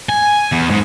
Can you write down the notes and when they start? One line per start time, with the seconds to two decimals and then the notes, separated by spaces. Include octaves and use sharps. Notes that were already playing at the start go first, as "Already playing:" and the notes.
0.09 G#5
0.52 E2
0.71 G#2